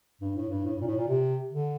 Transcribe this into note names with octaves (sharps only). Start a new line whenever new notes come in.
G2
A2
G2
A2
G2
A#2
A2
A#2
C3
D3